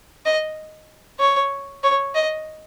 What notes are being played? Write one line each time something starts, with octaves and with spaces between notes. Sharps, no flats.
D#5
C#5
C#5
D#5